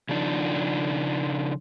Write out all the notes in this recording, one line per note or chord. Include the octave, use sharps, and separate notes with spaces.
C#3 F3 D4 D#4